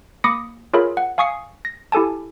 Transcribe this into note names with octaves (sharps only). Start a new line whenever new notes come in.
A#3 B5 D6 D#6 A#6 C#7
F4 G#4 A#4 C#5 E5 B5
F#5
F5 G#5 C#6 D#6 C7 C#7
A#6
E4 G4 A4 G#5 A5